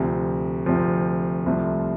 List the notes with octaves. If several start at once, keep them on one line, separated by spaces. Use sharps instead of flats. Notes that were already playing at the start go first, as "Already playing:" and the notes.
Already playing: D2 C3 F3
D2 C3 F3
C2 C3 F3 A3